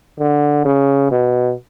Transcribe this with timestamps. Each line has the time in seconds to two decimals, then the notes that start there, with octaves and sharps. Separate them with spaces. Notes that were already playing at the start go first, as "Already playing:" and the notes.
0.19 D3
0.65 C#3
1.11 B2